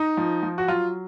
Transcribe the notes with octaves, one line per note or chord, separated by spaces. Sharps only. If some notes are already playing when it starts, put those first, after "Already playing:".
Already playing: D#4
F3
F3
F#4
F#3 F4